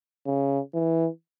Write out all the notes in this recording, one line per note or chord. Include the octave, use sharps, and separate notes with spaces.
C#3
E3